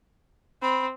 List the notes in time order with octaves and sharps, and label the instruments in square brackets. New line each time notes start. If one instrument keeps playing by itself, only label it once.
[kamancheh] C4 [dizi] B5